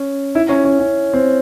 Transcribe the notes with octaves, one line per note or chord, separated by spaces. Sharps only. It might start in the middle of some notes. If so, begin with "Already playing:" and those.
Already playing: C#4
E4
C#4
C#4
C#4
C4